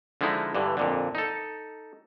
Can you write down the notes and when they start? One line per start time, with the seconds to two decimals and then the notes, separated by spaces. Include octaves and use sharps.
0.21 D3 F3 G#3 D#4 E4
0.55 G2 D3 E3
0.77 F2 A#2 D3
1.15 D#4 A4